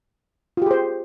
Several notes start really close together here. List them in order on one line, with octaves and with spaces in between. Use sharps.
F4 G4 G#4 C5